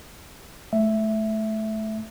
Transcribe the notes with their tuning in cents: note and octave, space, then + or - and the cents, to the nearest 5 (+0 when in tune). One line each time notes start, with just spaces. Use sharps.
A3 -25 E5 +5